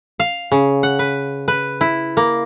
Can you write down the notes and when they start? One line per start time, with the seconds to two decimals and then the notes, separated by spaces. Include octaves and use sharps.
0.20 F5
0.52 C#3
0.83 F#5
0.99 B4
1.48 B4
1.81 E4
2.17 A#3